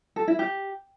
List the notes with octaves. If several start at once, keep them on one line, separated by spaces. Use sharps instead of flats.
A4
E4
G4